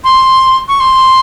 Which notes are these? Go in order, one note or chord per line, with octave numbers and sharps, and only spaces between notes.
C6
C#6
C6